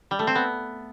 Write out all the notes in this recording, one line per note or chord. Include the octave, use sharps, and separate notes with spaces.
G3
A3
C4
B3